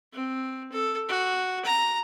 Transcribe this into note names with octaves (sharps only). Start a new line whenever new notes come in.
C4
A4
F#4
A#5